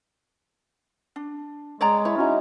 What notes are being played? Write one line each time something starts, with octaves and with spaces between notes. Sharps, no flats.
D4
G#3 C#5 D5 A#5
E4 C#5
C#4 D#4 F#4 E5